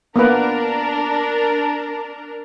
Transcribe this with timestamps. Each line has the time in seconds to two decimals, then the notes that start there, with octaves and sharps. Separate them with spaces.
0.16 A#3 B3 D4 A#4 B4